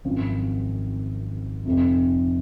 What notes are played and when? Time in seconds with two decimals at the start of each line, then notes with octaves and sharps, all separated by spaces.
0.05 G#1 F#2 F3 C4 F4
1.65 F1 F2 C3